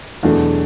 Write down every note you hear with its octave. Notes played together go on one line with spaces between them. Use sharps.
E2 B2 F#3 A3 D4